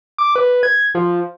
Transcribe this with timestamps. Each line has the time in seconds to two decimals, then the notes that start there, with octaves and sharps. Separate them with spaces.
0.18 D6
0.36 B4
0.63 G#6
0.95 F3